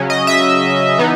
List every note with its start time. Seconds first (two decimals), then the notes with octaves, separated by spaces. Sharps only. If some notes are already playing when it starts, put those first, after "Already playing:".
Already playing: C#3 F#3 C#4
0.10 D#5
0.27 E5
0.98 E3 B3 D#4